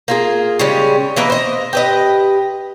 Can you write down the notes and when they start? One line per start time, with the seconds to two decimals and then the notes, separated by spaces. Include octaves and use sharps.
0.08 A#3 F4 G#4
0.59 C#3 G3 G#3 C#4
1.16 E3 A#3 B4 D#5
1.30 C5 D#5
1.73 G4 B4 D#5